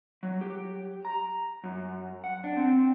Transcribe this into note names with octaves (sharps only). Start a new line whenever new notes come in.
F#3
G4
A#5
F#2
F#5
D4
C4